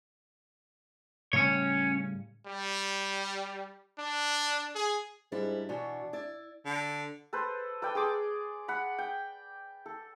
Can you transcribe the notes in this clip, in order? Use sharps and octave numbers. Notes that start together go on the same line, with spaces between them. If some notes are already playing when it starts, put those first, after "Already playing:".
A2 C#3 G3 C#4 C#5
G3
D4
G#4
G#2 G3 D4 E4
B2 E3 D4 F#4
E4 D5
D3
A4 B4 C5
A4 B4 D5 G5
G#4 C6 D6
F#5 B5
G5
A4